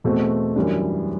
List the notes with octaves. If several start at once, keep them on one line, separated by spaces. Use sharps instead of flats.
E2 B2 A3 C4 F#4
F#2 E3 G3 D4